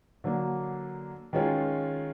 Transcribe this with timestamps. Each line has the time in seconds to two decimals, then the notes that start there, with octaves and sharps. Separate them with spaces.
0.24 D3 F#3 A#3
1.33 D#3 G#3 C#4 F4